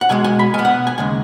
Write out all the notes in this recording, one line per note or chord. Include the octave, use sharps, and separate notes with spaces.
F#5
B1 B2 G#3 G#5
G#5
B5
B2 B3 G#5
F#5
G#5
D#2 C#3 G#3 G#5